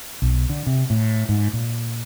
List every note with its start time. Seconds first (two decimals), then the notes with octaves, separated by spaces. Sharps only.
0.22 B1
0.49 D3
0.67 C3
0.90 A2
1.29 G#2
1.53 A#2